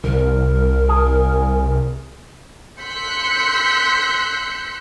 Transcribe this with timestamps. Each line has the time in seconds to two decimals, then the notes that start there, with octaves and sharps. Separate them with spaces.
0.04 C2 A#4
0.89 G#4
2.81 C6 E6 F#6 G6 B6 C#7